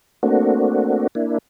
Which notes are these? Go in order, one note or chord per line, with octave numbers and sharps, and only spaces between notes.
A3 A#3 C4 D4 F#4
A#3 D4 E4